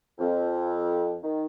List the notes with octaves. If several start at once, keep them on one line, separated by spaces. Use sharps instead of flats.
F2
D#3